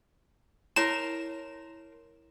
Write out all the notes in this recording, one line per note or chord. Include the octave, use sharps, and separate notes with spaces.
E4 A#4 C#5 A#5 C6 E7